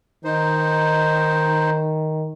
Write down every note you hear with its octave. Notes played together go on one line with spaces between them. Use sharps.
D#3 D#4 C5